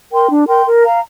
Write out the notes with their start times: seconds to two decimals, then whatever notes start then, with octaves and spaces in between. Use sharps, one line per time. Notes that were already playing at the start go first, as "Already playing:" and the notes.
0.12 A#4 G5 C6
0.30 D4
0.48 A#4 G5 C6
0.65 A#4
0.83 F5 A#5